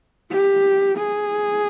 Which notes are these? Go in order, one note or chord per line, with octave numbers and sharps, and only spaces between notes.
G4
G#4